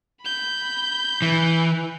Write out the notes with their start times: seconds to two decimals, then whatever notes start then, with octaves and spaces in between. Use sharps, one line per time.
0.22 B5 G6
1.22 E3